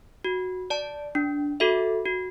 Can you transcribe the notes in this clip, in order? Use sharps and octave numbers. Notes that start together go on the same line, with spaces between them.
F#4
D5 A5
D4
F#4 A4 E5
F#4